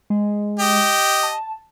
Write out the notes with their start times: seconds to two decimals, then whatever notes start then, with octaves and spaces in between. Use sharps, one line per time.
0.10 G#3
0.59 G4 D#5
1.23 A5